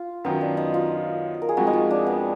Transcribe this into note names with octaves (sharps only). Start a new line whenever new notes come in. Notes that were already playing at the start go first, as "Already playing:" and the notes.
Already playing: F4
F#2 D#3 F#3 B3
D4
D#4
F4
A#4
G#4
F2 F3 G#3 F#4
D#4
F4
D4
B3